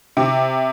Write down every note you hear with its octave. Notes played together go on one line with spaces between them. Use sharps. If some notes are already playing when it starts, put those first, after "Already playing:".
C3